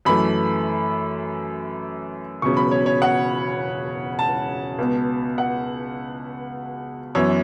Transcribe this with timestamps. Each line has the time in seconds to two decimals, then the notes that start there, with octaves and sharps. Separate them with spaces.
0.05 F#2 E3 A3 B5
2.42 E1 E2 C#3 F#3 C#6
2.57 B5
2.71 C#5
2.86 C#5
3.02 F#5
4.19 A5
4.78 C#2 B2 B3
5.38 F#5
7.15 F#2 E3 B3 C#5